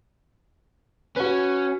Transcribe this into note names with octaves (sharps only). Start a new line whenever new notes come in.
C#4 F#4 B4